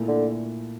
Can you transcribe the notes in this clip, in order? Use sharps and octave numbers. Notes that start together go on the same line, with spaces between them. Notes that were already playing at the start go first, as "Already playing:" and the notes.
Already playing: A#2 A3 E4
D3